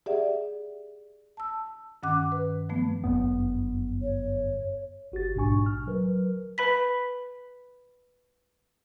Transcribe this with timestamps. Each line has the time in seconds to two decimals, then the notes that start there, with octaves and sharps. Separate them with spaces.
0.06 G4 G#4 D5 E5 F#5
1.37 A5 E6
2.03 G2 D#3 C#4 F#5 D6 F#6
2.32 B4
2.69 F3 A3 B3
3.04 G1 F#2 B3
4.02 C#5
5.12 G1 F#4 G4 A6
5.35 A#1 G#2 B2 D4 G#5 C#6
5.66 F6
5.87 F#3 A#4 B4
6.58 B4 B5 B6